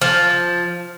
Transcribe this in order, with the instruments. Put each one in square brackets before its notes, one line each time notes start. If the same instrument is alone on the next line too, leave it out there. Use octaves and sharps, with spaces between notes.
[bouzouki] F3